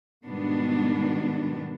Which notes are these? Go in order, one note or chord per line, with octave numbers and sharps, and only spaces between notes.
G#2 B2 D#3 G3 B3 D4